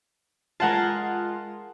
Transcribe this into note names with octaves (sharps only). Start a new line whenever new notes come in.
G#3 F4 A#4 F#5 A5